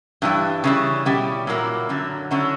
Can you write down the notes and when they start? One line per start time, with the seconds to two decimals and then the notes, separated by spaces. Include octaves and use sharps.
0.22 G2 E3 G3
0.64 C#3 E3 G3
1.06 B2 G3 C#4 E4 G4
1.47 A#2 F#3 A#3 E4
1.89 F#2 D3 F#3
2.31 D3 F#3 C#4 E4